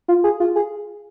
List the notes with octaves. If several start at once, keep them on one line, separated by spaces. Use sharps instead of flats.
F4
G#4
F4
G#4